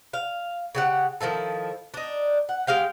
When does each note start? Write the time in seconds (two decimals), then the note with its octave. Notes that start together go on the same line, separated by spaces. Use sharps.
0.13 F5
0.75 C#3 G4 F#5
1.21 D#3 F3 E4 A4
1.94 D4 D#4
2.49 F#5
2.67 G#3 G4 F5 G5